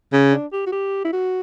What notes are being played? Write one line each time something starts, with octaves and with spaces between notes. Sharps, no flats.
C#3
D4
G4
F#4
G4
E4
F#4